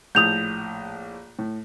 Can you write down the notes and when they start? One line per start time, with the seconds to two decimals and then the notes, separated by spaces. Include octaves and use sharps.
0.15 A#1 A2 D#6 G6 F7
1.39 A2